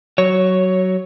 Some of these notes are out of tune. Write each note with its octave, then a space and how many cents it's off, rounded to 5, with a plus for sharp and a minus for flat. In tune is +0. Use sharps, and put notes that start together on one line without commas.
F#3 +15 C#5 +0